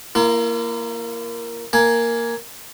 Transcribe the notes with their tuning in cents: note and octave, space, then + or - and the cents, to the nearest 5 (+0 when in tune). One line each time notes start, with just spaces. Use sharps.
A#3 +0 E4 +45
A#3 +0 G#5 +5